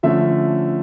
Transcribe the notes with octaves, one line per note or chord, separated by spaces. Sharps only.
D3 F3 A3 C#4 E5